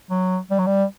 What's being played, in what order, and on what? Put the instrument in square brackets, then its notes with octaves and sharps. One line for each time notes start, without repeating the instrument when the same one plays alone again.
[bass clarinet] F#3
G3
F#3
G3